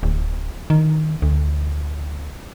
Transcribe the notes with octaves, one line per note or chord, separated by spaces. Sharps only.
D1
D#3
D2